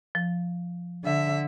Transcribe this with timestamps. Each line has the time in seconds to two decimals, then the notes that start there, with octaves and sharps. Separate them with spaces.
0.15 F3
1.04 D3 E5